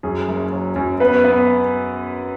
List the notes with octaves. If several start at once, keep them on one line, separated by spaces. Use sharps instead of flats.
F#2 G#4
F#1
F#3
F#2
B3 B4
B3